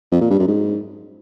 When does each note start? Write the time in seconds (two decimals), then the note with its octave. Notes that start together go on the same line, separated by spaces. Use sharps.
0.12 F2
0.21 A#2
0.30 G2
0.39 F#2
0.48 G#2